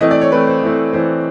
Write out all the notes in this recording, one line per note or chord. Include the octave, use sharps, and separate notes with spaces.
E3 A3 C4 D#5
D5
C#5
E3 A3 C4 B4
C5
E3 A3 C4
E3 A3 C4 C5